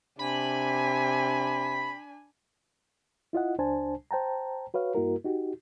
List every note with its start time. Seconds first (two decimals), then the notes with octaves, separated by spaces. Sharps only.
0.19 C3 D4 G#5 B5
3.33 E4 F4 D#5 F#5
3.58 C#2 D4 C5 G#5 A5
4.11 C5 G5 A5 A#5
4.74 F#4 B4 C#5 F5
4.95 G2 A#3 E4 F#4 A#4
5.24 D#4 F#4 G4